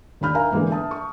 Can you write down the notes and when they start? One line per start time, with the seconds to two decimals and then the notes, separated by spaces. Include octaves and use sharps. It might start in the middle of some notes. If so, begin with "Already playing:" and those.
0.21 D#2 D4 B5 F6 G6
0.34 A#4 E5 F5 G#5 A#5
0.51 D3 E3 G#3 A#3 B3
0.71 E5 A5 D#6
0.91 C#6